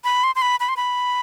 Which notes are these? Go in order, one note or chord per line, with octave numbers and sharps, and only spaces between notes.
B5
C6
C6
B5
B5
C6
B5